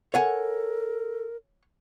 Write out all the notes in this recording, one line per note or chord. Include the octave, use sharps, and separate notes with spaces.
A4 A#4 C#5 F#5 G#5